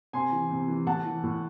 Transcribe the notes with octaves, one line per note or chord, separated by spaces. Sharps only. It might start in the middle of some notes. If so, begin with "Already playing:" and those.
C3 G#5 C6
E3
C3
E3
A2 F#5 A5
E3
A2